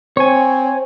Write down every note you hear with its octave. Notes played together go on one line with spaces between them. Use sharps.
C4 C#5 G#5